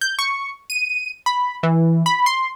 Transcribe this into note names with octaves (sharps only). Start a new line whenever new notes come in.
G6
C#6
D#7
B5
E3
B5
C6